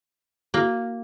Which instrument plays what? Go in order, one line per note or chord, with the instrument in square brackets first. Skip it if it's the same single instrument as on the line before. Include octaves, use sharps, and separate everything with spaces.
[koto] A#3 [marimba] E4 F#4